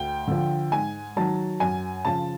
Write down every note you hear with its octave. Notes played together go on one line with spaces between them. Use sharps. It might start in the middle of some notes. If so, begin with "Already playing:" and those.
Already playing: D2 G5
D3 F3
G#2 G#5
D#3 F#3 A5
F#2 G#5
C#3 F3 A5